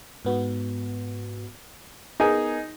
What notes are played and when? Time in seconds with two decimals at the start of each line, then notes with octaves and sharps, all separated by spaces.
0.25 G#2 B3 F#4
2.20 B3 D#4 G#4 A#4 G#5